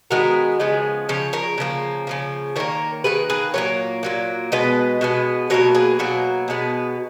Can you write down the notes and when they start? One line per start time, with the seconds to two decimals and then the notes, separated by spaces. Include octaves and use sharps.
0.11 D#3 G#3 B3 F#4 A#4
0.60 C#3 F3 G#3 B3
1.09 C#3 F3 C#5
1.33 A#4 C#5
1.58 C#3 F3 A#3
2.07 C#3 F3 A#3
2.56 D#3 A#3 A#4 C#5
3.04 D#3 A#3 G#4 B4
3.30 G#4 B4
3.54 A#2 F#3 A#3 A#4 C#5
4.03 A#2 F#3 A#3
4.52 B2 G#3 B3 B4 D#5
5.01 B2 G#3 B3
5.50 B2 F#3 A#3 A#4 C#5
5.75 G#4 B4
5.99 B2 F#3 A#3 F#4 A#4
6.48 B2 G#3 B3